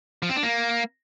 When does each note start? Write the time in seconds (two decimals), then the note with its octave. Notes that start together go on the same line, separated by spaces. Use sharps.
0.22 F3
0.29 C4
0.36 D4
0.43 A#3